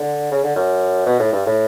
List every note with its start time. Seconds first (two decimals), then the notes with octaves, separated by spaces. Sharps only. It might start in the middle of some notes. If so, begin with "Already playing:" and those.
Already playing: D3
0.31 C#3
0.44 D3
0.56 F#2
1.06 B2
1.19 A2
1.33 G2
1.46 A2